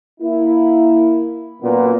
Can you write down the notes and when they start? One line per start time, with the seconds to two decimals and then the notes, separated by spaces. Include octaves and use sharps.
0.21 A#3 E4
1.62 F#2 A#2 B3